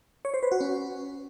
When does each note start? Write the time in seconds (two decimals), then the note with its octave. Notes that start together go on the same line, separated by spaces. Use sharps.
0.25 C#5
0.34 C5
0.43 B4
0.52 F#4
0.61 C#4